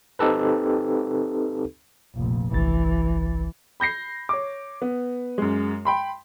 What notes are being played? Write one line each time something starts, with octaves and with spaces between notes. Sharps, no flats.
C4 D#4 G4 A4 B4
F1 A#1
G1 C2 E3 A6
B5 G6 A#6 C7
C#5 D6
B3
F#2 G#3
G5 B5 C6